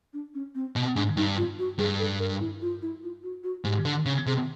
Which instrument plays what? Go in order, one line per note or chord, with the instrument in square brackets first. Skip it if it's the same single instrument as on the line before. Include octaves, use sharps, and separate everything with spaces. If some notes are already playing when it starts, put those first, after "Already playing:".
[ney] D4
C#4
C4
[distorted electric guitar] B2 [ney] B3
[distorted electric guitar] G#2 [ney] D4
[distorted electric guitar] G2 [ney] D#4
[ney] F4
F#4
[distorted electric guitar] G2 [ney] G#4
[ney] A4
A#4
E4
F4
E4
F4
F#4
F#4
[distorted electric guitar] G#2 [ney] G4
[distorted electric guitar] D3
C#3
[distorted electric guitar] C3 [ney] G#4